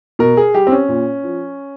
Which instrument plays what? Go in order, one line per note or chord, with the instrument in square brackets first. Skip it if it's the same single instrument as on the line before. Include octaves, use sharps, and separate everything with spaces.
[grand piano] B2 A#4
G#4
G3 G4
C4
C#4
A#2
F3